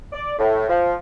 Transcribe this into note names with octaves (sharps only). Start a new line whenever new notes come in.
D5
A2
F3